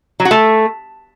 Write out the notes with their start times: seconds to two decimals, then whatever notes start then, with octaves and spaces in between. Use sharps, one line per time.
0.20 F#3
0.25 F#4
0.31 A3